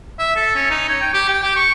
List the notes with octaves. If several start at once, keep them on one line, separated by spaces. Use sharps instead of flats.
E5
A4
C#4
D#4
C#5
G5
G4
G5
G4
C#6